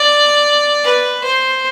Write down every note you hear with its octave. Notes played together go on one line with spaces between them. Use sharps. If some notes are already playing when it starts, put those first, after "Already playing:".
Already playing: D5
B4
C5